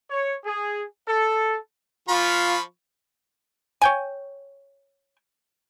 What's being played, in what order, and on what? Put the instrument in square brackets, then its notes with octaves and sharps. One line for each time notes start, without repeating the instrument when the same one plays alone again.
[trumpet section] C#5
G#4
A4
[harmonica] F3 B5 C#6 [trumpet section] F4
[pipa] C#5 G5 G#5